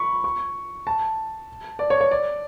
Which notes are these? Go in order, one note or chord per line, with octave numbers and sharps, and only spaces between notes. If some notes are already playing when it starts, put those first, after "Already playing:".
Already playing: B5 C#6
C#6
A5
D5
C#5
C#5
D5